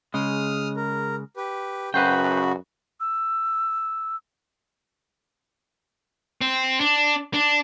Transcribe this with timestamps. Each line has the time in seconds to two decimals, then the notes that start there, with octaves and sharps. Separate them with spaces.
0.14 C#3 G#3 D#6 F6
0.76 A#4
1.37 G4 B4
1.94 F#2 C#3 F#4 B4 C5 G5 B5
3.00 E6
6.41 C4
6.80 D4
7.34 D4